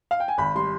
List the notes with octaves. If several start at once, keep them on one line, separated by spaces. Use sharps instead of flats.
F5
G5
G#5
G#1 B5
G3 C6